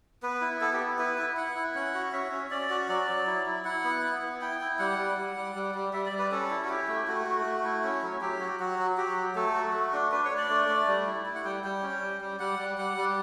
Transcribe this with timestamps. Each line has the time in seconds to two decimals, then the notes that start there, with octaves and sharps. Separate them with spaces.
0.23 B3 B4
0.41 E4
0.61 B3 A4
0.73 G4
0.80 B3
0.99 E4 B4
1.18 E4
1.37 E4 F#5
1.56 E4
1.75 C#4 F#5
1.94 F#4
2.13 C#4 E5
2.32 C#4
2.51 C#4 D5
2.70 F#4
2.89 F#3 D5
3.08 F#3
3.27 E4
3.46 E4
3.65 E4 F#5
3.84 B3
4.03 E4
4.22 B3
4.41 E4 G5
4.61 E4
4.79 G3 F#5
4.98 G3
5.17 G3
5.36 G3
5.56 G3
5.75 G3
5.93 G3 E5
6.06 D5
6.12 G3
6.19 B4
6.31 C#4 A4
6.51 E4
6.64 F#4
6.69 E4 G4
6.88 A3
7.07 A3 F#4
7.27 A3
7.46 A3
7.64 E4
7.84 C#4
8.03 F#3
8.21 F#3 G4
8.41 F#4
8.60 F#3 F#4
8.79 F#3
8.98 F#4 G4
9.16 F#3
9.35 A3 A4
9.55 F#4
9.73 A3
9.93 D4
10.12 D4 B4
10.25 C#5
10.31 D4
10.37 D5
10.50 A3
10.68 A3
10.88 G3
11.07 E4
11.26 E4
11.35 F#5
11.44 G3 G5
11.64 G3 G5
11.83 C#4
12.02 G3
12.21 G3
12.40 G3 F#5
12.59 G3
12.78 G3 F#5
12.97 G3